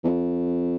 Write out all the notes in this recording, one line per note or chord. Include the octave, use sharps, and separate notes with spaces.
E2
F2